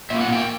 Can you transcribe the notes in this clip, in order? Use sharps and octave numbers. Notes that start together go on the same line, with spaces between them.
A#2 A#3 E5
F#5
G5